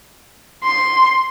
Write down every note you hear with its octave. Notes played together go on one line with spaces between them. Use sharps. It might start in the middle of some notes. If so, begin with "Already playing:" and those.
C6